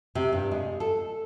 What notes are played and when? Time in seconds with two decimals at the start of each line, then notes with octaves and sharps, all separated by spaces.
0.15 C3
0.33 G2
0.51 G#3
0.80 A4